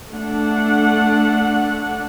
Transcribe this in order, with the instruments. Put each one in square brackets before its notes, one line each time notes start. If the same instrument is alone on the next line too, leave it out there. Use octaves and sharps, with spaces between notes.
[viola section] A3 D4 F#5